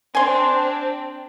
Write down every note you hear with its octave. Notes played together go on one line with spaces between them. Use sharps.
C4 D4 G#5 C6